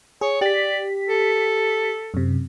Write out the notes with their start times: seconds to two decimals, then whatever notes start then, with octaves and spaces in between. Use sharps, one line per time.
0.21 G#4 C#5
0.41 G4 D5 B6
1.08 A4
2.14 F#2 C3